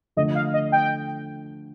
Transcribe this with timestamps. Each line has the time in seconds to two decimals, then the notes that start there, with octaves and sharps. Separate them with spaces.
0.17 D3 F3 A3 D#5
0.35 F5
0.53 D#5
0.72 G5